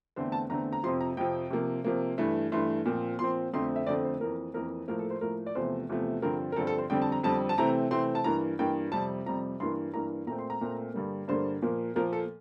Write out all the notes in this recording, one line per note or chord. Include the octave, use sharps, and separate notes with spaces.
E2 D3 A3 C4 C5
A5
E2 D3 A3 C4 A#5
A#5
F2 C3 F3 C6
A#5
F2 C3 F3 G5
C3 F3 A#3
C3 F3 A#3
G2 E3 A3
G2 E3 A3 C6
A#2 F3 C4
A#2 F3 C4 C6
F2 D3 A3 C4 C6
E5
F2 D3 A3 C4 D5
C5
F2 E3 A#3 A#4
F2 E3 A#3 A#4
A2 F3 A#3 A#4
A4
C5
A2 F3 A#3 A#4
D5
E2 C3 F3 A3 C5
E2 C3 F3 A3
G2 D3 F3 C4 A#4
A#4
G2 D3 F3 C4 A4
A4
C5
F2 D3 G3 C4 G5
A5
A#5
F2 D3 G3 C4 A5
A5
C3 E3 A3 C4 A#5
C3 E3 A3 C4 C6
A5
G2 E3 A#3 A#5
G2 E3 A#3 G5
F2 C3 G3 A5
F2 C3 G3 A#5
G2 E3 A#3 C6
G2 E3 A#3 A#5
A#2 A3 C4 A#5
C6
A#5
A#2 A3 C4
G2 D3 G3 A#3
G2 D3 G3 A#3 C5
A#2 F3 A#3
A#2 F3 A#3 A#4
A4